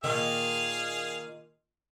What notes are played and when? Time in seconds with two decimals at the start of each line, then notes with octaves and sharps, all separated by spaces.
0.04 A#2 D#3 G#4 F5